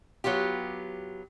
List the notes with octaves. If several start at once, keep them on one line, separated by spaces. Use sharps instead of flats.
F#3 B3 F4 G4